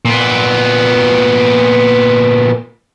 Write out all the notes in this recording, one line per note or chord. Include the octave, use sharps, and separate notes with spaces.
A#2 B3